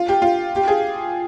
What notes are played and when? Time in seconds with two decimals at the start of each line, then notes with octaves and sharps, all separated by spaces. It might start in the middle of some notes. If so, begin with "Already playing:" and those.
Already playing: F4
0.09 G4
0.22 F4
0.56 G4
0.68 G#4